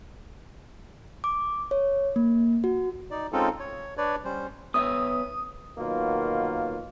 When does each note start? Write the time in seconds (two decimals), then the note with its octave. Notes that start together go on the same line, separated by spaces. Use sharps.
1.24 D6
1.71 C#5
2.16 A#3
2.64 F#4
3.11 D#4 D5
3.33 G#3 C4 C#4 D#4 F4 A4
3.60 C#5
3.97 D4 B4 C#5 D5
4.24 G3 C#4 C5
4.74 B3 C#5 E5 D#6
5.78 B2 D#3 F#3 A#3 F4